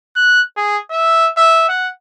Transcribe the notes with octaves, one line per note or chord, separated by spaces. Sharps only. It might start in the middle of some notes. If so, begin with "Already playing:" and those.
F#6
G#4
E5
E5
F#5